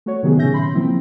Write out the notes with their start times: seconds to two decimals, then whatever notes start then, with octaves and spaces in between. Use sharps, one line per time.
0.06 A3 F#4 C#5
0.23 C3 D#3 F#3 B3 F#4 G#4
0.37 A#2 C#3 C#4 E5 G6 A#6
0.54 B5 C6
0.74 F3 F#3 A#3 C4 E4 F4